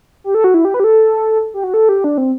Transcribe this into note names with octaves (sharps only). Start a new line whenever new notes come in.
G4
A4
F#4
E4
G4
B4
G4
A4
G4
F#4
A4
G4
D4
C4